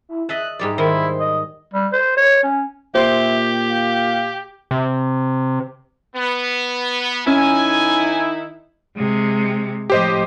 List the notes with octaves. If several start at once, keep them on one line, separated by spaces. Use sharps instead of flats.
E4
D#5 E5 A5 F#6
G#2 G3 D5 D#5
D#3 E4 C5
D#5
G3
C5
C#5
C#4
A#2 G4 C5 E5
F5
C3
B3
D#3 C#4 D#4 E4 G#5
C3 G#3
A2 F3 G4 C5 D#5